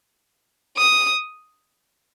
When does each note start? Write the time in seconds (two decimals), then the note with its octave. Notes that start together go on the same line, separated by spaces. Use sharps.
0.78 D#6